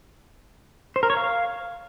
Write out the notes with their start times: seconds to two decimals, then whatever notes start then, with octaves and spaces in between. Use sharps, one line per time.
0.96 C5
1.03 A#4
1.10 C#5
1.17 F5